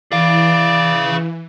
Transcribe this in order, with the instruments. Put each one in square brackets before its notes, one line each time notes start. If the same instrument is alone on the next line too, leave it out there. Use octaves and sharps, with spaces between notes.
[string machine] E3 [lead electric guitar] G#4 F5 [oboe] D5